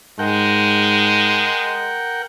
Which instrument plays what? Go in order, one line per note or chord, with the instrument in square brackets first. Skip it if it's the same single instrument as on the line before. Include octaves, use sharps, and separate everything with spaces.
[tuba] G#2 [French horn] G#3 [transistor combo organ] A#4 F#5 G5